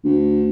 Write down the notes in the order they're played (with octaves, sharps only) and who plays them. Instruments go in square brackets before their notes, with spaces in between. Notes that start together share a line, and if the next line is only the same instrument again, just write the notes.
[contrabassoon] D2